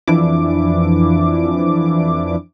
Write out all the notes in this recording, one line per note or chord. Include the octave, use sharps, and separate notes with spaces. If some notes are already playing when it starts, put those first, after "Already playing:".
F2 E3 F3 D4 E4 D6